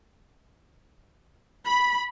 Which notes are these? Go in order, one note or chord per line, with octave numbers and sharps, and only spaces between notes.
B5